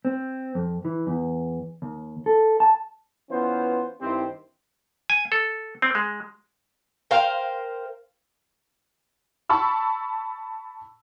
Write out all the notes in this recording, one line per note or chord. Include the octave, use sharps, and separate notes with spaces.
C4
F2
E3
E2
D#2
A4
A5
E3 B3 C#4 F4 C5
G2 D#3 C4 E4 G4 C5
G#5
A4
C4
G#3
A#4 C5 F5 G5
A5 B5 C#6 E6